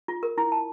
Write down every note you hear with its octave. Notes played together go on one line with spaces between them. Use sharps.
F4
A#4
E4
A5